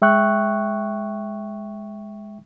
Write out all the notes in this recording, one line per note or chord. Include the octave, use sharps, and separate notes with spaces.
G#3 E5 G5 C#6 F#6